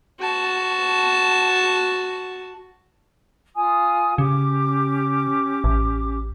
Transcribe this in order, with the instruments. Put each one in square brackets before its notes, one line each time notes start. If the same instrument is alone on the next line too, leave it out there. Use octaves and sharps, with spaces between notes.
[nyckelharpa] F#4 A5
[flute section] F4 G#5 D#6
[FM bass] C#3 [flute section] C#4 G4 D6
[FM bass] A1